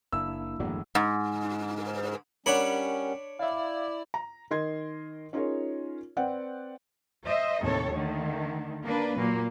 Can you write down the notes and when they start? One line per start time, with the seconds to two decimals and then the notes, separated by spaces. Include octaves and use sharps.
0.12 F#1 A#3 D4 E4 E6
0.59 D1 A1 E2 G2 F#3 F#4
0.95 G#2
2.46 G3 C#4 D4 A#4 C#5 F#5 B5
3.39 E4 D5 E5 F5
4.14 A#5
4.51 D#3 A#4 D#5 C6 G#6
5.33 C#4 D#4 F4 G#4 A#4 C#5
6.17 C4 B4 D5 F#5 G5
7.26 C5 D#5 E5
7.62 D#2 A2 C3 A4 C#5
7.94 D3 D#3 A3
8.84 A#3 D4 B4
9.17 A#2 F#3 A#3